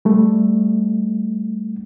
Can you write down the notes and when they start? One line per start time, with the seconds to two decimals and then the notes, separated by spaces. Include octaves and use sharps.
0.05 G3 A3